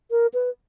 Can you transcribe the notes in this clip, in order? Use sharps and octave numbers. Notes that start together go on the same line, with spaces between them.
A#4
B4